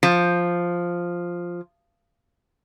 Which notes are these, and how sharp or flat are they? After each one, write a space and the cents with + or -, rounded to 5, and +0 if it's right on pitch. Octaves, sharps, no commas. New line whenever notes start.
F3 +0